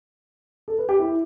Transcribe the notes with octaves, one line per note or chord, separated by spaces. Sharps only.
A4
B4
G4
E4